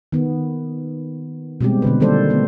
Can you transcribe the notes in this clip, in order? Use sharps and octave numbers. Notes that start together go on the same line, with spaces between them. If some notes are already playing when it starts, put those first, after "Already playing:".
D#3 B3
B2 G3 G#3 C4 G4
B2 D3 B4
D#3 G3 A#3 A4 C5 D5
A3 B3